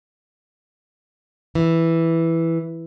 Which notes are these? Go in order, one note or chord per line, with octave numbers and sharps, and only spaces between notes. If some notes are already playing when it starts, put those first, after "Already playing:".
E3